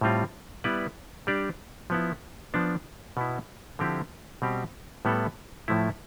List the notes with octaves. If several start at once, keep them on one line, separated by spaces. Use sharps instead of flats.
A2 G3 C4 F4
G3 B3 E4 B4 D5
G3 D4 G4 D5
F3 B3 E4
F3 B3 D4
B2 B3 E4
D3 F3 C4 E4 G4
B2 G3 C4 G4
A2 G3 B3 E4 A4
A2 F3 A3 E4